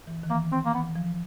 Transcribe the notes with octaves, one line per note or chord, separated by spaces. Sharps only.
E3
D#3
E3 A#3
D#3 C4
A#3
E3 B3
F3